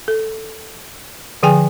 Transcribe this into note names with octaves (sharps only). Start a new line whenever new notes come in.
A4
D3 F3 G#4 G5 G#5